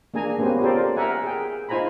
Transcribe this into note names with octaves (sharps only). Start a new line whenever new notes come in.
A#3 D4 G#4 G#5 A#5
A#3 B3 C#4 G4 C5
F4 G4 A4 A#4 C5 D5
A#4 E5 F#5 G#5
G#4 G5
D#4 F4 C5 G#5 A#5 B5